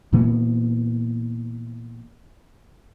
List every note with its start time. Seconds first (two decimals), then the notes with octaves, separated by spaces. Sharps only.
0.12 A#2 E3 A#3 B3